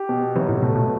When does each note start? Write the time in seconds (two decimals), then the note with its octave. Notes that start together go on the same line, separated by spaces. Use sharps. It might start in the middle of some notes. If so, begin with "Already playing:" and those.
Already playing: G4
0.09 B2
0.36 C3 E3 F#3
0.49 A2 C3
0.62 B2 A3
0.75 B2